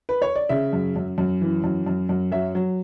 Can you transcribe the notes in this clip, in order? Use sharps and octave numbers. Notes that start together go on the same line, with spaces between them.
B4
C#5
D5
C#3 E5
F#2
F#2
F#2
E3
F#2
F#2
F#2
F#3 E5
F#3